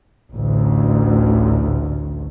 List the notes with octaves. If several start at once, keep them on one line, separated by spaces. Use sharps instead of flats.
A1 D2